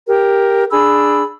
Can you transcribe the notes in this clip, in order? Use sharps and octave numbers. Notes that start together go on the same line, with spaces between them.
G4 A#4
D4 G#4 B5 E6